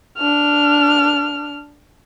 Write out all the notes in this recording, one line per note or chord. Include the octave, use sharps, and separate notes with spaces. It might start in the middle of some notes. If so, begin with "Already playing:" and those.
D4 F6